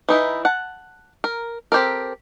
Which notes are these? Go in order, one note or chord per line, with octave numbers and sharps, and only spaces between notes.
E3 D#4 E4
F#5 A5
A#4
C4 G4 A4 A#4